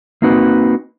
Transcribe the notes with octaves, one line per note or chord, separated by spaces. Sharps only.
A#3 C4 D#4 F#4 B4